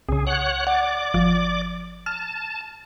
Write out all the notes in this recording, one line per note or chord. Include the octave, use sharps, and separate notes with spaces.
C2 C#3 G#4
C#5 F#5 F#6
D5 F#5 D6
G1 F3
A5 F6